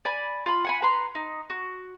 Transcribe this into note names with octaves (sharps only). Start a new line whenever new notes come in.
D5 G#5 B5
F4 B5
F#5 G#5 B5
B4 A#5 C6
D#4
F#4